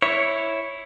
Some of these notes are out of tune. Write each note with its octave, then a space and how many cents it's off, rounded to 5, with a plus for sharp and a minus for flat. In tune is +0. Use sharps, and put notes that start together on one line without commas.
E4 +0 C#5 +0